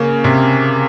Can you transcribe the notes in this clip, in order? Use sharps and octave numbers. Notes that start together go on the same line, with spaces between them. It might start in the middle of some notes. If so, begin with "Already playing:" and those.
Already playing: C#3 A#3
C3